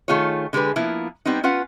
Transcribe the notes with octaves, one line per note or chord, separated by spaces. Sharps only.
D#3 A3 F4 G#4 C#5
D3 G#3 G4 G#4 B4
F3 A#3 B3 E4
G3 B3 C4 D#4
C#4 F4 B4 F5 F#5